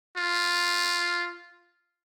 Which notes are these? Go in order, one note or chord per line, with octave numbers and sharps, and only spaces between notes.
F4